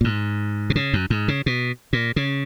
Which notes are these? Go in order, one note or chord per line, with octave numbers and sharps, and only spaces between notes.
A#2
G#2
B2
C#3
F#2
G#2
C#3
B2
A#2
C#3